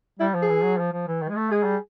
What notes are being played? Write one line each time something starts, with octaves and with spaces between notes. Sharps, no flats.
G3 E4
F3
G#4
E3
F#3
F3
F3
E3
D#3
G#3
A3
G#3 G#4
G3